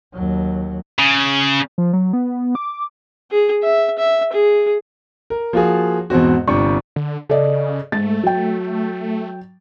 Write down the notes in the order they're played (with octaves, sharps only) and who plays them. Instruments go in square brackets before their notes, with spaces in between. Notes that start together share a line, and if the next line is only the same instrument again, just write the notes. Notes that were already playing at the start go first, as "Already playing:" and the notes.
[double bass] D#2 F#3
[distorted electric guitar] C#3
[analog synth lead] F3
F#3
B3
D6
[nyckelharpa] G#4
E5
E5
G#4
[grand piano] A#4
F3 A#3 F4 F#4 G#4
E2 G#2 B2 C4 F#4
G1 C3 G3 D4 C#6
[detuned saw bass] D3
[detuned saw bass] C#3 [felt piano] A4 D5 D#5
[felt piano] G#2 A6 [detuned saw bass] A3
[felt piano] F#3 G5